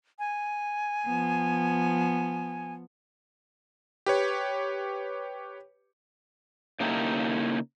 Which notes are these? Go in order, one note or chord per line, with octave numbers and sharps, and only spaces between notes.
G#5
F3 B3
G4 B4 C#5
C#3 A#3 D#4 E4 G4 A4